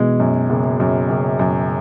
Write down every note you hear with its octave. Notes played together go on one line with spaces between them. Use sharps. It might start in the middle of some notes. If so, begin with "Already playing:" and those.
Already playing: B2 E3 G#3
F#2
F#1
F#2
F#1
F#2